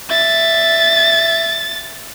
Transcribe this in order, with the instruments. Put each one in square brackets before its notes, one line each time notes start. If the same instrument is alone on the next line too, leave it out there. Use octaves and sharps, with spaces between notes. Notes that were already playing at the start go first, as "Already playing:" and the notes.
[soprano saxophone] E5 [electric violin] A6